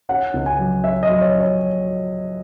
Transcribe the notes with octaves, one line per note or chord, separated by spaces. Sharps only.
C#4 F#5
C#2
G#5
F#3
C#4 E5
D#5
F#3
C#5
C#4
C#5